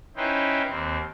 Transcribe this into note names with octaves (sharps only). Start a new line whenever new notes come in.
C#4 D#4 E4 B4 C5 G5
D#2 C4